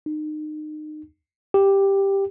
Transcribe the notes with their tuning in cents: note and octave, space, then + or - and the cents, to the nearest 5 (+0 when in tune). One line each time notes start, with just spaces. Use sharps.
D#4 -30
G4 +5